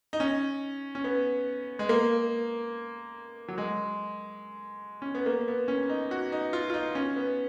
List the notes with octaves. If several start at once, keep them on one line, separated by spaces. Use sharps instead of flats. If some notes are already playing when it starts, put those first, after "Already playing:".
D#4
C#4
C#4
B3
G#3
A#3
F#3
G#3
C#4
B3
A#3
B3
C#4
D#4
F#4
D#4
F4
F4
D#4
C#4
B3